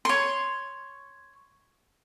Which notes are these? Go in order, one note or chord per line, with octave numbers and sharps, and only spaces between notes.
C#5 C6